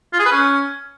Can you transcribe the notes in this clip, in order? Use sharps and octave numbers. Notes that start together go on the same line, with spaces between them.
F4
G#4
B4
C#4